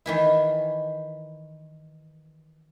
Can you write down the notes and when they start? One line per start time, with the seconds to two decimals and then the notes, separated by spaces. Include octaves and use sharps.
0.06 D#3 E3 E4